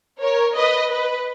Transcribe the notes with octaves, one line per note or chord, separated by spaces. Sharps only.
A#4 C#5
B4 D#5
B4